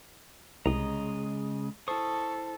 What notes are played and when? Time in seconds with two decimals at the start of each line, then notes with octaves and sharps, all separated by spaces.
0.66 C2 C#3 G#3 D#5 A#5
1.88 E4 A4 C5 C#6 D#6